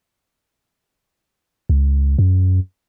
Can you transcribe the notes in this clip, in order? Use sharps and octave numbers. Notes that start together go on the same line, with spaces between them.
C#2
F#2